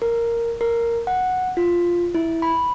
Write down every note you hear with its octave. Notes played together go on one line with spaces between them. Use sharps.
A#4
A#4
F#5
F4
E4
B5